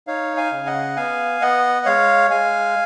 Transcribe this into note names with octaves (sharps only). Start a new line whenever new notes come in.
D#4 C#5 F5
F5 G#5
C#3
D#5 F#5
B3 F5 G#5
B3 D#5 F#5
G#3 C#5 F5
G#3 F5 G#5